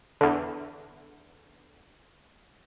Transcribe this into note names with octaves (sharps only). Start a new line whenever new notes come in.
E2 D3